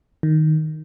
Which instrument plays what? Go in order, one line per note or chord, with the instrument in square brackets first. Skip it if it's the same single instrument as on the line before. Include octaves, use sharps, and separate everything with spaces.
[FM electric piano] D#3